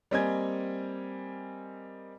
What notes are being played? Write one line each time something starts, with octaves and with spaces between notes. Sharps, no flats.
G3 A#3 C4 D#5 G#5 G#6